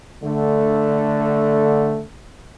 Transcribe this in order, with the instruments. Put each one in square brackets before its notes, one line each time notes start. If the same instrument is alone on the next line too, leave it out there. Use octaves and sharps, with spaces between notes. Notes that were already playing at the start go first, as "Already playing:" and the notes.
[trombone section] D3 A3